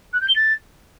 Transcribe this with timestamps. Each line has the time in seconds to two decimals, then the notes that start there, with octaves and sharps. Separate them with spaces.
0.13 F#6
0.20 G6
0.28 G7
0.35 A6